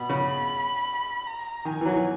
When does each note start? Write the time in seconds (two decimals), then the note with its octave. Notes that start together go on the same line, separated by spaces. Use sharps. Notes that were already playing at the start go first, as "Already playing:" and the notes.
Already playing: B2 B5
0.09 C#3
1.27 A#5
1.65 D#3 G#5
1.81 E3
1.85 F#3
1.95 E3